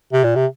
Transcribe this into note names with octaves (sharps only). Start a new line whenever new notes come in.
C3
A#2
C3